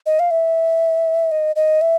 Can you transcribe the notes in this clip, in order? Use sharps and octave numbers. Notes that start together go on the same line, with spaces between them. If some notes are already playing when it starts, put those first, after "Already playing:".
D#5
F5
E5
D#5
D#5
E5